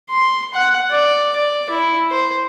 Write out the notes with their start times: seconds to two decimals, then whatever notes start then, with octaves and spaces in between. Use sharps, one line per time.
0.10 C6
0.54 F#5
0.92 D5
1.36 D5
1.70 E4
2.11 C5